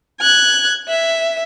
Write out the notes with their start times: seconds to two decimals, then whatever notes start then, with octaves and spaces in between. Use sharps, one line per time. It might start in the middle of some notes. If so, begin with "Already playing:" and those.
0.21 F#6 G#6
0.88 E5